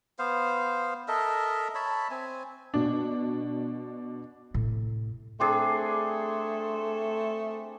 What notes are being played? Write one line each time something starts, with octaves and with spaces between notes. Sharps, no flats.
B3 C5 F5
A4 A#4 D#5 E5
C#5 E5 A5 B5
C4 G#5
B2 D4
A2 C3
A3 C4 D4 G#4